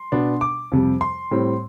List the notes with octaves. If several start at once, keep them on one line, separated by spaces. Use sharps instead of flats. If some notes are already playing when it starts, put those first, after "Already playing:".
Already playing: C6
B2 B3 D4
D6
F2 C3 G3
C6
A2 G3 C4